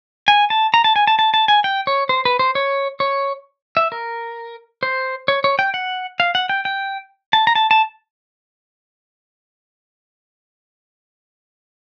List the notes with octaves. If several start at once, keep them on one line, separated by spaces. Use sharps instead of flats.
G#5
A5
A#5
A5
G#5
A5
A5
A5
G#5
G5
C#5
C5
B4
C5
C#5
C#5
E5
A#4
C5
C#5
C#5
G5
F#5
F5
F#5
G5
G5
A5
A#5
A5
A5